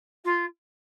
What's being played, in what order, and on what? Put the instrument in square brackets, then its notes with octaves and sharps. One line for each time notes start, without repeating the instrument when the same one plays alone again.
[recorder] F4